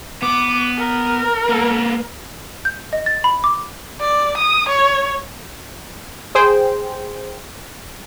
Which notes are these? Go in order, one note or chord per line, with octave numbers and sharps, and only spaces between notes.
B3 D6
A#4
A#3 B3
G6
D#5
A6
B5
D6
D5
D#6
C#5
G#4 C5 G5